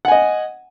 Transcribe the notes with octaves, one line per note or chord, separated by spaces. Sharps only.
D#5 F#5 G#5